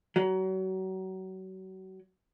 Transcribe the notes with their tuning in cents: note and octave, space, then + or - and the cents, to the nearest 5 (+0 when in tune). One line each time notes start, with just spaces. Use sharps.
F#3 +30